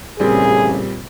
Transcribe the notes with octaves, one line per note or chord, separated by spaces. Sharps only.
A1 A#2 C#3 G3 C4 G#4